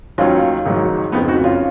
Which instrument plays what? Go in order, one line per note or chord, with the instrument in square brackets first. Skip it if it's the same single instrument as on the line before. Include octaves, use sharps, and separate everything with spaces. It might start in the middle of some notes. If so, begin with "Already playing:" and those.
[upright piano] D#2 D#3 F#3 C#4 F4
G#1 G#2 D#3 F#3
F#1 F2 F3 B3 D#4
D#4 F#4
C#4 F4